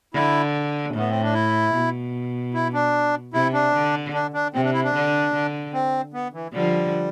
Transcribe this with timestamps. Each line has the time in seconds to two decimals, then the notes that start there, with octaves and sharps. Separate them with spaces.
0.13 D3 E4
0.94 A2 B3
1.10 C4
1.22 D4
1.34 E4
1.74 B2
2.54 E4
2.73 D4
3.34 C3 E4
3.53 D4
3.74 D3
4.13 D4
4.34 D4
4.54 C3 C4
4.64 D4
4.73 E4
4.84 D4
4.94 D3
5.34 D3
5.73 C4
6.14 B3
6.34 E3
6.53 D3 F3 G3